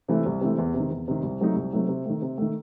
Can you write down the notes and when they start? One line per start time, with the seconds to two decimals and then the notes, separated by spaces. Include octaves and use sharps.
0.08 C3 E3 A3
0.26 C2
0.41 C3 E3 A3
0.58 E2
0.74 C3
0.80 D#3
0.91 E2
1.08 C3 D#3
1.23 C2
1.41 C3 F#3 A3 D#4
1.56 C2
1.73 C3 F#3 A3 D#4
1.88 C3
2.05 D#3 A3
2.22 C3
2.38 D#3 A3